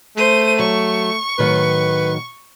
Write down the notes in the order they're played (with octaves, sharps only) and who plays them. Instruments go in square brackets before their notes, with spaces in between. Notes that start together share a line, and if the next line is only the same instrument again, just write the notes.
[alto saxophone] A3 [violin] C5 D#7
[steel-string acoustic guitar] F#3 [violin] C#6
[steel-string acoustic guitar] A2 D#3 F#3 [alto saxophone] B4